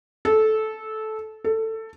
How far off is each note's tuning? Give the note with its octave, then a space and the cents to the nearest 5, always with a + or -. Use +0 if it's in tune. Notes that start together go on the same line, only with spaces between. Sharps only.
A4 -15
A4 +15